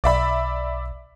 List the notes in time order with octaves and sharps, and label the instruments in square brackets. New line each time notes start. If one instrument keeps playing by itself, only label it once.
[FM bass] B1 [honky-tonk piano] D5 E5 B5